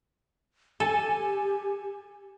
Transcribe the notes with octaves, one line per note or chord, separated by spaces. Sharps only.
G4 A4 G#5